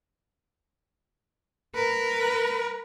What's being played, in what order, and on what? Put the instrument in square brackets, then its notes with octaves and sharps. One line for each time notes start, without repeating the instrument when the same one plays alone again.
[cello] A#4 B4